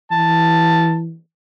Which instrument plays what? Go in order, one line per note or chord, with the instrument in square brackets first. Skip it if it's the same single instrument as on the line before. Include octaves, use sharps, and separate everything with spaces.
[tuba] E3 [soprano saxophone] A5